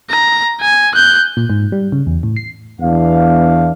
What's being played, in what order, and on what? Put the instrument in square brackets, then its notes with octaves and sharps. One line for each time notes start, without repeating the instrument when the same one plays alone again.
[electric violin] A#5
G#5
F#6 G6
[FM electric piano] A#2
G#2
G3
C#3
E2
A2
C7
[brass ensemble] E2 E3 B3 D4 F5